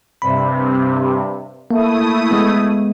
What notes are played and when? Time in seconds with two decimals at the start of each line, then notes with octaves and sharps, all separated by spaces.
0.22 G2 C3 B5
1.71 A3 A#3 E4 D#6
2.31 G#3 B3